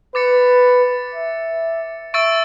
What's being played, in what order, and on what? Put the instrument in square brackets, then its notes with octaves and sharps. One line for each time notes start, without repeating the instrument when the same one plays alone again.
[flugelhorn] B4 [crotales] D6 A6 C#7
[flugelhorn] E5
[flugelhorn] E5 [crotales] C#6 E6 A6 D7